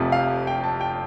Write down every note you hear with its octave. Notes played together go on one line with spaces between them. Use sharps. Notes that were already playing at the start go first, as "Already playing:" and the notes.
Already playing: F1 F2 C3 F3
F5
G5
A5
G5